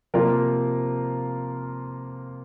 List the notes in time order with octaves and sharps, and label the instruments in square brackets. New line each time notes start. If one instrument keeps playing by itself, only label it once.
[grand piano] C3 F3 A#3 F4 A#4